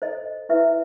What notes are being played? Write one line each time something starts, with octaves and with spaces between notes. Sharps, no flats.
A4 C5 D#5
E4 B4 E5